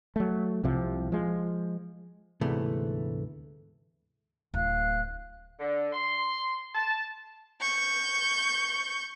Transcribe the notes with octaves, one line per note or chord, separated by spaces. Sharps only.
F#3 A3
C2 C3 F3
F3 G#3
D2 G#2 C3 E3 A3 B3
D1 F5 F#6
D3
C6
A5
C#6 G6